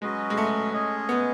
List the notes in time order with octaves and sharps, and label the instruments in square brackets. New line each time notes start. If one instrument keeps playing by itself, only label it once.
[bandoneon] F#3 C#4 F#4 B4 D#5 [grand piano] G#3
[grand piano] G#3
A3
[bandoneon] G#3 C#4 G#4 D#5
[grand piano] B3